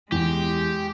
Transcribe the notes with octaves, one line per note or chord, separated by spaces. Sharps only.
E2 G#3 G4